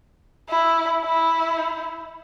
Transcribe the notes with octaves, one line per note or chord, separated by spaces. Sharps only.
E4
E4